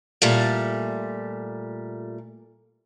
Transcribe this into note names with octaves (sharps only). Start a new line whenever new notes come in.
A#2 G3 A3